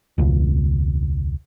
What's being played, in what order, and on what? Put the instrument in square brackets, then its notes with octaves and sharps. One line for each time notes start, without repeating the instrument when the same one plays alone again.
[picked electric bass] E1 C#2